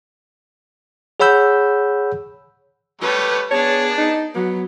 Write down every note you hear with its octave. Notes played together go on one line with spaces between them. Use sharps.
G#4 C#5 F#5 B5 E6 G6
G3 A3 B4 C#5
B3 D4 G#4 C#5 A5
D#4
F#3 B3